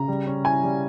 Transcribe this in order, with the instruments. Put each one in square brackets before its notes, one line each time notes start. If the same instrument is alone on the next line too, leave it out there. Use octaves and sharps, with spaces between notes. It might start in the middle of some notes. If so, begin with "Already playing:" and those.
Already playing: [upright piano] C#3 A#5
G3
C#4
E4 G#5
G3